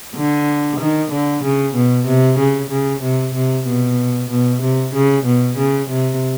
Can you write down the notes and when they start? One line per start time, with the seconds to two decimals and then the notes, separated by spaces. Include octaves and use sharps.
0.16 D3
0.80 D#3
1.12 D3
1.44 C#3
1.75 B2
2.07 C3
2.39 C#3
2.71 C#3
3.03 C3
3.34 C3
3.67 B2
4.30 B2
4.62 C3
4.94 C#3
5.26 B2
5.58 C#3
5.90 C3